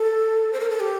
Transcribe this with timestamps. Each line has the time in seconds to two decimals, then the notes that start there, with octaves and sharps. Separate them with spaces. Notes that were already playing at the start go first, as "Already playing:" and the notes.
Already playing: A4
0.53 C5
0.60 A#4
0.70 A4
0.80 G4